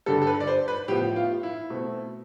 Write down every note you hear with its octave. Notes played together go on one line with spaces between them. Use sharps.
G2 D3 G3 A4
A4
B4
D5
C5
B4
A2 F3 B3 G4
F4
E4
B2 A3 C4